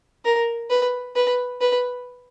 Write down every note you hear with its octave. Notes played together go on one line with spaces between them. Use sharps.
A#4
B4
B4
B4